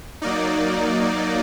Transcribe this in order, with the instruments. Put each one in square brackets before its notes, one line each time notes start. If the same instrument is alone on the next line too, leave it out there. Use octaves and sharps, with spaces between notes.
[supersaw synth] F#3 A#3 D#4 D5